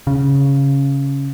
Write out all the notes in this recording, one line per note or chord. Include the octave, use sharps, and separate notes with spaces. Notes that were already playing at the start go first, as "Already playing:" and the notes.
C#3